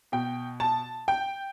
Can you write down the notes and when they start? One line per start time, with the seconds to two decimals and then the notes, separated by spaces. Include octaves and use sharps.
0.12 B2 G5
0.60 A5
1.08 G5